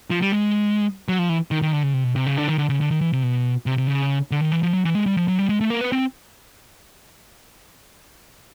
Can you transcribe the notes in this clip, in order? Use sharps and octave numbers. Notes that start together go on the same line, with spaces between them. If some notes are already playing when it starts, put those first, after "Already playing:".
F3
G3
G#3
F#3
F3
E3
D#3
D#3
D3
C#3
C3
B2
C3
C#3
D3
D#3
D3
C#3
D3
D#3
E3
C3
B2
C3
C3
C#3
D3
D#3
E3
F3
F#3
E3
G#3
G3
F3
F#3
G3
G#3
A3
A#3
B3
C4